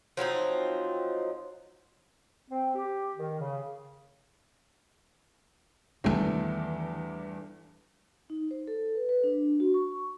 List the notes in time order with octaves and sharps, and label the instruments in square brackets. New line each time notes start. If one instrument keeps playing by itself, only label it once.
[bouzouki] F3 F#3 C4 D#4
[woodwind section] C4
G4
D#3
C#3
[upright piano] E2 G2 A3 [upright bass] D#3 E3
[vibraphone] D#4
C5
A4
B4
B4
D4
F#4
C#6